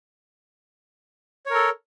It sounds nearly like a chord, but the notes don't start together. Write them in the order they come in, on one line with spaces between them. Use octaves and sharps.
C#5 A#4 A4